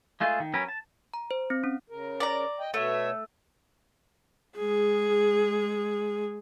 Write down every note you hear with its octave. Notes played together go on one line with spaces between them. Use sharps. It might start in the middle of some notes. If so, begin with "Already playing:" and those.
G#3 A3 F4 G#4
D#3
F#3 C#4 A#4 B4
A5
A#5
C5
C4
C#4
C#3 A#4
D5 A#5
D#5 G5
B2 A3 C#5 E5
G#3 G#4